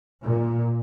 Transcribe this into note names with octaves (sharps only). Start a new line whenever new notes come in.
A#2